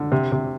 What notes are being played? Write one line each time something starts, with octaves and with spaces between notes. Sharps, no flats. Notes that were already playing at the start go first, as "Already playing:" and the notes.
Already playing: D3
C3
C3